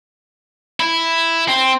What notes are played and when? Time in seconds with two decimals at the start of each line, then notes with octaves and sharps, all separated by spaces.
0.80 E4
1.48 C4